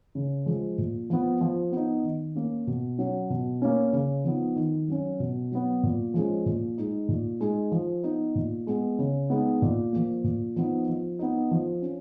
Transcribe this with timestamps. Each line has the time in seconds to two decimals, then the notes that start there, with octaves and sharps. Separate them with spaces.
0.15 C#3
0.46 F3 G#3
0.78 A#2
1.10 F3 B3
1.41 F3
1.72 B3 D#4
2.04 D#3
2.35 A#3 C#4
2.67 B2
2.98 F#3 C#4
3.30 B2
3.62 A#3 C#4
3.93 C#3
4.24 F3 B3 D#4
4.56 D#3
4.88 F#3 C#4
5.20 B2
5.52 F#3 B3
5.83 A#2
6.14 F3 G#3 C#4
6.46 A#2
6.78 G#3 D#4
7.08 A#2
7.40 G#3 D#4
7.72 F3
8.04 B3 D#4
8.35 A#2
8.67 G#3 B3
8.99 C#3
9.30 G#3 B3 D#4
9.62 A#2
9.93 F3 A#3
10.24 A#2
10.56 F3 B3 D#4
10.88 F3
11.19 B3 D#4
11.51 F3
11.82 C#4